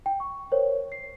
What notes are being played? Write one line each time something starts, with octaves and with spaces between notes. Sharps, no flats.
G5
C#6
A#4 C5 C#5
C7